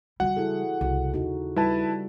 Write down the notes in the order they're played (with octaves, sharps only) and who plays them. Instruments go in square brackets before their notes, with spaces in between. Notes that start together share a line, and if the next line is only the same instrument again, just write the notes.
[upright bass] C#3 G3 [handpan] F#4 [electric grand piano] F#5
[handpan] E4 G#4 A4
[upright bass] C2 [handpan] C#3 F#4
[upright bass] D#2 [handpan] D#4 F#4
[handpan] G3 [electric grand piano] E4 B4 A5